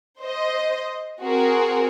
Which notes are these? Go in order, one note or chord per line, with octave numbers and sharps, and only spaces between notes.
C5 D#5
C4 F#4 G#4 A#4